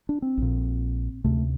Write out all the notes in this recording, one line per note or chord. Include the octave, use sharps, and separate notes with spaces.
D4
C4
A#1 A#2
D2 C3 A3